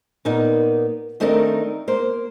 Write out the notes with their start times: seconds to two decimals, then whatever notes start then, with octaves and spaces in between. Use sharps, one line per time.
0.25 A#2 A#3 B3 D#4
1.20 D#3 A3 C4 D4 D#4 A#4
1.88 A#3 C5